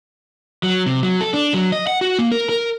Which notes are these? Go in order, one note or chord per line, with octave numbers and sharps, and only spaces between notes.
F#3
C3
F#3
A4
D4
F#3
D#5
F#5
F#4
A#3
A#4
A#4